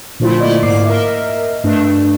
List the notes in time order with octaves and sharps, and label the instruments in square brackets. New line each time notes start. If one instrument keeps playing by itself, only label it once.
[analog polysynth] A#2 D3 F3 A3 E4 F4
A3 A#3 E4 D5 D#5
G#2 A#3 D6 C7
A#4 D#5 E5
G2 A3 D4